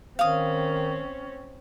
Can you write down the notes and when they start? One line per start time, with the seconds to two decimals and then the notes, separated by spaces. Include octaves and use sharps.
0.19 D#3 C4 C#4 F5 D#6